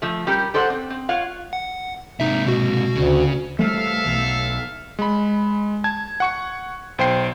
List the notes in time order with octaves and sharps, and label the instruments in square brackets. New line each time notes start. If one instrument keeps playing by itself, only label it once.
[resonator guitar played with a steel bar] F3 A3
G3 C#4 G4 A#4
G4 A4 C5 D5 F5 F#5
C4
C4
F4 C#5 F5 F#5
[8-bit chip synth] F#5
[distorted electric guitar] G#2 C3 [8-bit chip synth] D#4 E5
[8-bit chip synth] B2 F#4
[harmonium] D2 [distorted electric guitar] C#3
[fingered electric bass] E3 G3 [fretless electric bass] A3 [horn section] A4 E5 F5
[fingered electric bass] B1
[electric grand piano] G#3 B5
A5 G#6
F#5 C#6 C#7
B1 C5 G5 C7